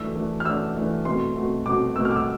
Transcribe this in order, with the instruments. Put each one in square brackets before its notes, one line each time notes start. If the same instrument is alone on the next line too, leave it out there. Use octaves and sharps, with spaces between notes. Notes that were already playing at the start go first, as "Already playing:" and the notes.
Already playing: [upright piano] E3 A3 D4 E6
E3 A3 D4
F6
E3 A3 D4 E6
E3 A3 D4
B2 A3 C4 C6
B2 A3 C4
B2 A3 C4 D6
B2 A3 C4 E6
F6
D6
E6